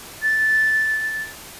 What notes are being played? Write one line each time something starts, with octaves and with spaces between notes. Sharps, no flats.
A6